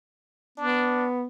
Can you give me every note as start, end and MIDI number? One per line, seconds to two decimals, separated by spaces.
0.58 1.26 59
0.58 1.07 62